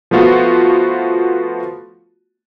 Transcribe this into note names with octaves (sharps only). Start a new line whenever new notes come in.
F3 A3 B3 F4 F#4